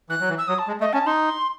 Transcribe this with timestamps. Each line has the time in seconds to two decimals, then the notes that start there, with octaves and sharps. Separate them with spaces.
0.09 E3 F#6
0.20 F#3
0.29 E3
0.38 E6
0.48 F#3 D#6
0.59 A5
0.68 G#3
0.80 A3 D#5
0.93 C#4 A5
1.06 D#4 C6